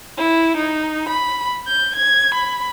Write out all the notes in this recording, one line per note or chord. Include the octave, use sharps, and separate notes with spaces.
E4
D#4
B5
G6
G#6
B5